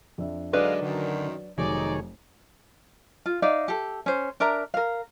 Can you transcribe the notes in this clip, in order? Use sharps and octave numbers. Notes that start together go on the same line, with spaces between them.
F2 D4 E5
G#2 D3 F#3 G#3 D4 B4 D#5 F5
F#2 D3 D#3
F1 D#3 F#3 D#4 G#4 C#5 D5 G#5
F4
D#4 D5 E5 F5
G4 A4
C#4 C5
D4 A#4 E5 A#5
A#4 F5